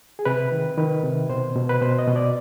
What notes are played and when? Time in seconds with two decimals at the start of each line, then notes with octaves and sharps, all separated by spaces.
0.19 G#4
0.25 C3 B4
0.52 D#3
0.78 D#3 B4
1.04 C3
1.30 B2 C5
1.56 B2
1.69 B4
1.81 B2 C5
1.99 D#5
2.07 B2
2.16 D5